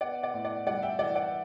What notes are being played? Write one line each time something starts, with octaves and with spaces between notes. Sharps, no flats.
B3 D5 F#5
D5 F#5
A2
D5 F#5
G3 D5 F#5
E5 G5
E3 D5 F#5
D5 F#5